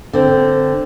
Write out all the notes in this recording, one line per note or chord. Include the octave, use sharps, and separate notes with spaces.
D3 C4